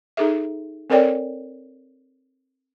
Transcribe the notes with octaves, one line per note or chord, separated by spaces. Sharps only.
D#4 G#4 A4 E5
C4 A4 A#4 C#5 D5 G5